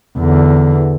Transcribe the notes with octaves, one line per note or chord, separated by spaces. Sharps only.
E2 D3